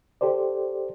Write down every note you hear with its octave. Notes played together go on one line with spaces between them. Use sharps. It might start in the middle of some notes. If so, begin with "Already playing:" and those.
G4 A4 C5 D5